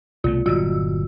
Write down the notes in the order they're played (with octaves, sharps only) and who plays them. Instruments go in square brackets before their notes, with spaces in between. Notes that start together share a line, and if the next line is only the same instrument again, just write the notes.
[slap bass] C2 B2 A3 [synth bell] F4
[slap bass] G1 A#2 F#3 [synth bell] F4 F#4 E6